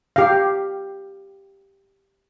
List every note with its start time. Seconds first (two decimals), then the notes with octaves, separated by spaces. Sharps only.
0.16 G4 F5